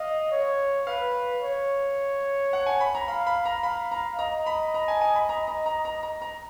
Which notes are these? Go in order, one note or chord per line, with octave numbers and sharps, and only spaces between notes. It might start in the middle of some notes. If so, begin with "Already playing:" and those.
Already playing: D#5 F5
C#5
B4 F5
C#5
F#5
G#5
B5
A#5
F5 B5
B5
A#5
F5 B5
A#5
D#5 A#5
B5
A#5
G#5
G#5
B5
A#5
A#5
A#5
A#5
A#5
A#5